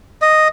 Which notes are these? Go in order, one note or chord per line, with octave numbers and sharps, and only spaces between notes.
D#5